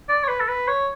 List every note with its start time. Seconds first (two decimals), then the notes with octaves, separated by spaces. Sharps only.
0.09 D5
0.24 C#5
0.28 B4
0.40 A4
0.48 B4
0.68 C#5